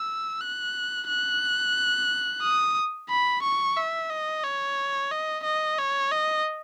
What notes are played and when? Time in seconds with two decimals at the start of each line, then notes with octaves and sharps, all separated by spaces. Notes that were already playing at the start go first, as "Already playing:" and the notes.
Already playing: E6
0.41 F#6
1.08 F#6
2.43 D#6
3.09 B5
3.43 C#6
3.77 E5
4.10 D#5
4.44 C#5
5.11 D#5
5.44 D#5
5.78 C#5
6.12 D#5